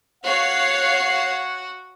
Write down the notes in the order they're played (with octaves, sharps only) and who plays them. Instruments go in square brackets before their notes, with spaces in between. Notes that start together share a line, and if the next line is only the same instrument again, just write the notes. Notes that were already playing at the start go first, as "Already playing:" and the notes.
[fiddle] F#4 [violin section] C#5 F5 C7 [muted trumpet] F#5